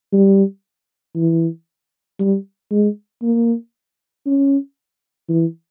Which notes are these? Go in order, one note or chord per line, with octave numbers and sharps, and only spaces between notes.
G3
E3
G3
G#3
A#3
C#4
E3